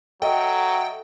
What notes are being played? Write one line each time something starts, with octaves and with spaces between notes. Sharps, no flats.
F#3 A4 D#5 E5 G5